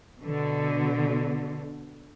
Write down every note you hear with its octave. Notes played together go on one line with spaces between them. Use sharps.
B2 D3